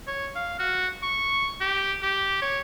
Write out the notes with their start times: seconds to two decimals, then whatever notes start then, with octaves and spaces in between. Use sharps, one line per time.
0.07 C#5
0.35 F5
0.59 F#4
1.03 C#6
1.60 G4
2.03 G4
2.42 C#5